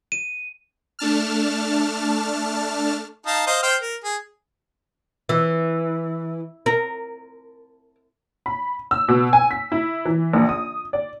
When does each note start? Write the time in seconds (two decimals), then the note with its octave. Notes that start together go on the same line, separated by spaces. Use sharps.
0.12 D#7
0.99 A3 D4 A5 F6
3.26 D#4 F5 A5
3.47 C5 D#5 F5
3.63 C5 G5 F6
3.82 A#4
4.05 G#4
5.29 E3
6.66 A#4
8.46 B5
8.91 E6
9.08 B2
9.33 G#5
9.51 B6
9.72 E4
10.05 E3
10.33 A#1
10.49 D#6
10.93 D5